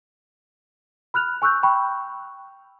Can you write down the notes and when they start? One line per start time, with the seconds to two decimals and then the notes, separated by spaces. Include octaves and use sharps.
1.14 B5 F6 F#6 F7
1.42 G#5 C#6 E6 F#6 G6
1.63 G5 B5 C#6